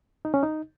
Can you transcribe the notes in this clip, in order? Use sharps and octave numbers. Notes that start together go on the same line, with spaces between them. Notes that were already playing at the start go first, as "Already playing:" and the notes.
D#4
C#4
D#4